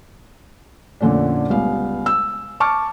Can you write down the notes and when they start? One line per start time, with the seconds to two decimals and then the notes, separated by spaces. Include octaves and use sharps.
1.01 F2 A#2 D3 A3 C#4 D4
1.50 C#2 G3 B3 F5
2.06 E6
2.60 A5 C#6 D6 F6